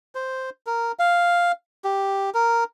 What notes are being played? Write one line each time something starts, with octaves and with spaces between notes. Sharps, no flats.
C5
A#4
F5
G4
A#4